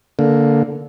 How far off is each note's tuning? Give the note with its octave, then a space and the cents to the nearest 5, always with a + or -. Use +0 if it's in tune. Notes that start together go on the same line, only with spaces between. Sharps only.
D3 -15 A#3 +0